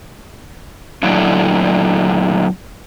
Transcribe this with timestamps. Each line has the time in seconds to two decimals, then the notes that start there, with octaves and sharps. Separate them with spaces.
1.03 A#2 D3 F#3 A3 D4 E4